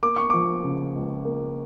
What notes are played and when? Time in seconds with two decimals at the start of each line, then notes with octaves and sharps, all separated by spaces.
0.03 A#3 D6
0.16 C#6
0.30 F3 D6
0.63 C#3
0.95 C#2
1.25 A#3